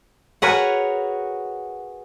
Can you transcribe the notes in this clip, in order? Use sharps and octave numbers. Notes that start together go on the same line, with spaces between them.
F#4 G#4 A#4 B4 C#5 F#5